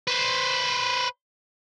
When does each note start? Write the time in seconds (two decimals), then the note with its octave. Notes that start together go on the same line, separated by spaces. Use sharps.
0.07 B4 C5